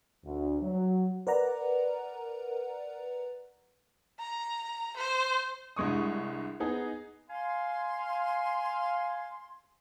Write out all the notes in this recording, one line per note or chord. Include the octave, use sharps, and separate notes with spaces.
D2
F#3
A#4 B4 D5 F#5 A#5
A#5
C5
C2 G2 G#3 C#6 D#6
B3 D#4 G#4
F5 G#5 C6